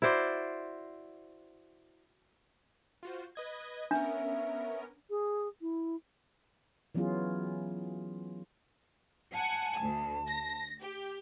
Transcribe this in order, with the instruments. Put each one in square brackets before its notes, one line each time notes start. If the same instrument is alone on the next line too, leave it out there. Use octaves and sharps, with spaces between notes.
[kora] E4 F#4 C5 D5
[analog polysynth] F4 F#4 C5
B4 D#5 G#6
[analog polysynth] B3 C#4 A#4 [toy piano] D4 [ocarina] E5
[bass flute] G#4
E4
[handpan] E3 F#3 B3 C#4 F4 G#4
[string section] F#5 G#5 [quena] A5
[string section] D2
A#6
G4